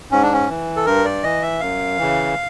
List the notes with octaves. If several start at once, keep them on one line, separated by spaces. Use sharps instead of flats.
G#2 C#4
D4
C#4
E3
A4
G2 A#4
D5
E3 D#5
E5
F#2 F5
C#3 E3